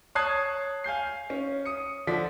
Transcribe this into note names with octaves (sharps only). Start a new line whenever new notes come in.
C#5 A5 D#6 F#6 G#6 C7
F5 G#5 G6 C7
C#4
D#6 C#7
D3 F3 D5 B6